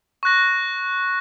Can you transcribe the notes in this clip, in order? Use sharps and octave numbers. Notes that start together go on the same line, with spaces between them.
C#6 F#6 A#6